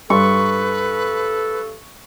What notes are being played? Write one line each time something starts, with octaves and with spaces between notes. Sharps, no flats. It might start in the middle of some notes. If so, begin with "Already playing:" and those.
G2 A4 B4 C#6